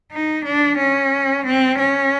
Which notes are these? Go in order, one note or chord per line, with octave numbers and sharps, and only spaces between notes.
D#4
D4
C#4
C4
C#4